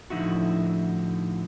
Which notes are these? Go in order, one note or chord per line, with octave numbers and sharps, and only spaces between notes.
A2 D3 F3 D#4 E4 F#4